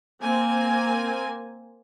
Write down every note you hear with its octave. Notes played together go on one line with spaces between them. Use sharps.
A#3 C4 G#5